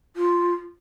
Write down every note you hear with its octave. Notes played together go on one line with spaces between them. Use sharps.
F4